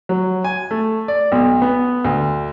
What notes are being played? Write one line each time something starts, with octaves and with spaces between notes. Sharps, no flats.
F#3
G#5
A3
D5
B1
B3
D2